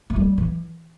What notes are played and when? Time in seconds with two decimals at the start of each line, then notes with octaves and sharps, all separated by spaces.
0.10 A3
0.16 G3
0.38 E3